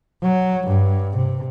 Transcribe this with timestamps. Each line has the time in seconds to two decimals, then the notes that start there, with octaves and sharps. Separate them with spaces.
0.23 F#3
0.67 G2
1.17 C3